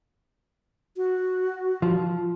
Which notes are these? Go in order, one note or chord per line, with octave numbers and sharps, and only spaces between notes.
F#4
F3